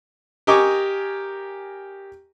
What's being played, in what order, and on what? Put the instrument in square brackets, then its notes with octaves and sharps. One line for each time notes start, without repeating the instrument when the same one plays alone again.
[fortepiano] G4 A#4 D#5 G#5 C#6 D6